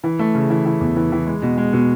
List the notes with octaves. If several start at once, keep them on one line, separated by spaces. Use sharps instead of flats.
E3
A3
C#3
E3
E3
E2
E3
E3
G#3
B2
G#3
B2